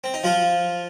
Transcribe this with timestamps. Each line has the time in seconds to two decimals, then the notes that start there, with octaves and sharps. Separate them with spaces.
0.04 C4
0.14 D#4
0.24 F3 F4